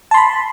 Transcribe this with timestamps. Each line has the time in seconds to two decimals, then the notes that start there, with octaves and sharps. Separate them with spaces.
0.11 A5
0.14 C6
0.17 B5